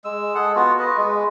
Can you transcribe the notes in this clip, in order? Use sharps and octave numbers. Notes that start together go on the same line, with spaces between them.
G#3 E6
G#4 A4 F#5
B3 F4 F#4
B4 D#5
G#3